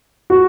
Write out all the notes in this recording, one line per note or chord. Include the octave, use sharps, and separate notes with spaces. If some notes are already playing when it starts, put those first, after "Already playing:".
F#4